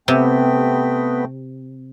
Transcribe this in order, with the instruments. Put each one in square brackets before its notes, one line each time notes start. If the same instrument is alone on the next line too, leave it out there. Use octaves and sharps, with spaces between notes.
[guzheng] C3 [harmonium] A3 C4 G5 [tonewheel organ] B3